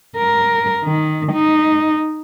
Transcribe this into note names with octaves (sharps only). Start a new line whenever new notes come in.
A#4
D#3
D#4